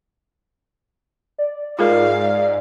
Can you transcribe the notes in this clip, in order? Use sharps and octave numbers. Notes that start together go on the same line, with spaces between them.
D5
G#2 F4 G#4 A#4 F5